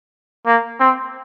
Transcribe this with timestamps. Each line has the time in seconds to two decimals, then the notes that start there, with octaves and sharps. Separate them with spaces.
0.46 A#3
0.80 C4